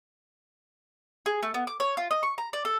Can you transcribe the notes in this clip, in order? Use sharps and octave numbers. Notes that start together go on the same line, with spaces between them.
G#4
A3
B3
D6
C#5
F4
D#5
C#6
A#5
D5
A4